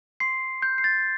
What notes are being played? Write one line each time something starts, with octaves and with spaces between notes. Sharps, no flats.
C6 C7
G6
C7
A6